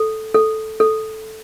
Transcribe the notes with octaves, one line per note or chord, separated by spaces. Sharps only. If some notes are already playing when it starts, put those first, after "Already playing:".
Already playing: A4
A4
A4